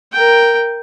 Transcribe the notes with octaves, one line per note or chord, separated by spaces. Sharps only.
A#4 G5